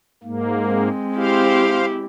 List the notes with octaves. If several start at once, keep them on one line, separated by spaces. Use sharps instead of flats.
G#2 A#3
G#3 C4
E4 G4 C5 F5